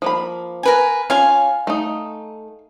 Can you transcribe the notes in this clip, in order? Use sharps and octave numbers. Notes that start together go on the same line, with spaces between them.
F3 A#3 B5
A#4 B4 G#5
C#4 F4 F5 G#5
A3 D#4